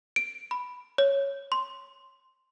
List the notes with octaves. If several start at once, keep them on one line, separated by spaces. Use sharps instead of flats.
D7
B5
C#5
C6